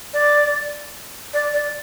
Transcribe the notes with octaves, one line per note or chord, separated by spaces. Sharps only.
D5
D5
D5